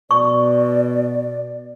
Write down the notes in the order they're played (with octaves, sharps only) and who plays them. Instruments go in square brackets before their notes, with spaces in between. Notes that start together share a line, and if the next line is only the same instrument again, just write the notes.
[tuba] B2 [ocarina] D5 [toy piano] C#6